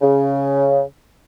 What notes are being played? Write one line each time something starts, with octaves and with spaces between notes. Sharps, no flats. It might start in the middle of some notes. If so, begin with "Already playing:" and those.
C#3